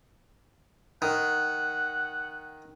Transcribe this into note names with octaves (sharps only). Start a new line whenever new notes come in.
D#3 F#5